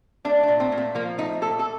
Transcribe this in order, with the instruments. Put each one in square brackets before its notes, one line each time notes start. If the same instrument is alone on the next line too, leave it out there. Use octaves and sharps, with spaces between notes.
[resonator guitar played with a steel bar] A3 D4
D4
A#2
C4
A#2
A3
F3 A#3
A3 D#4
A#2 A4
A4